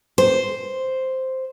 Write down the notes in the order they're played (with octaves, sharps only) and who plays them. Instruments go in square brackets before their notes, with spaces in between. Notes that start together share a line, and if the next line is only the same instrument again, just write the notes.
[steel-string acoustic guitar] C5